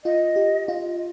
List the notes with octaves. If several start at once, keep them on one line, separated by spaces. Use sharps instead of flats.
F4 D#5
G4
F4